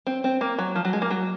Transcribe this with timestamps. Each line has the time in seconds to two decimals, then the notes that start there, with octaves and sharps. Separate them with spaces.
0.07 C4
0.24 C4
0.41 A#3
0.58 F#3
0.76 F3
0.85 F#3
0.93 G#3
1.02 A#3
1.10 F#3